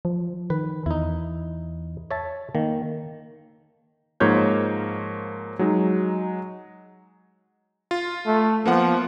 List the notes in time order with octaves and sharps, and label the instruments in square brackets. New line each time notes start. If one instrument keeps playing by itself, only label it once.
[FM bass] F3
[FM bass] D#3 [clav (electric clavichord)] B4
[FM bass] E2 [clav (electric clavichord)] D#4 E4
[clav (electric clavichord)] C#5 E5 A5
[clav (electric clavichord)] D#3 [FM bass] A#3
[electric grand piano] G#2 F3 A#3 C#5 G6 G#6
F#3 G#3 D#4
F4
[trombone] A3
[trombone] F3 [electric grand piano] A#3 B3 F#5